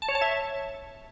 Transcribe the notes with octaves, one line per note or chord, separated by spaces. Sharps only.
A5
C#5
A5
E5